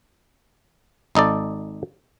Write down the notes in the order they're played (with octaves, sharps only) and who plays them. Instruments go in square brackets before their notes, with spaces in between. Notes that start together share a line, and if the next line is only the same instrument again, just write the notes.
[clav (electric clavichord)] G#1 D#4 A4 D5